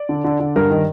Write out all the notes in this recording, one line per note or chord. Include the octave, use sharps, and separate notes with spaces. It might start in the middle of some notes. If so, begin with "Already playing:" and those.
Already playing: D5
D3
D3
D3
G2 A#4
D#3